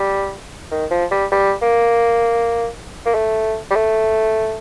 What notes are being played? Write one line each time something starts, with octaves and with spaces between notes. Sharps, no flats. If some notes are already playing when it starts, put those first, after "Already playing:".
Already playing: G3
D#3
F3
G3
G3
A#3
A#3
A3
G3
A3